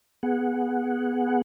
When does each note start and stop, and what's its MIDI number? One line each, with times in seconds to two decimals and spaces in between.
0.23 1.42 59
0.23 1.42 68
0.23 1.42 78